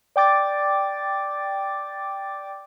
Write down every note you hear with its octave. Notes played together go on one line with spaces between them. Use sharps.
D5 G5 D6 A6